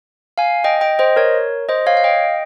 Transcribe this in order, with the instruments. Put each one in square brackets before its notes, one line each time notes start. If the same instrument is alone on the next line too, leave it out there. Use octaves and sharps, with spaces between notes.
[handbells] F5 G#5
D#5 G5
D#5 G5
C5 D#5
A#4 C#5
C5 D#5
C#5 F5
F5
D#5 G5